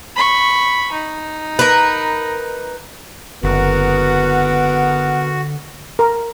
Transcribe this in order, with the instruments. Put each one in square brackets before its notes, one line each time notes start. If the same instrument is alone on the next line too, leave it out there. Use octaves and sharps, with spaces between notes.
[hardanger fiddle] B5 C#6
D#4
[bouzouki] A#4 B4
[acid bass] F#1 [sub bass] D3 [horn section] B3 A#4 [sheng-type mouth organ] F#4
[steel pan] A#4